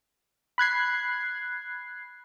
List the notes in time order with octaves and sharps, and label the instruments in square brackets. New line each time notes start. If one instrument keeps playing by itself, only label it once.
[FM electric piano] B5 F#6 G#6 C7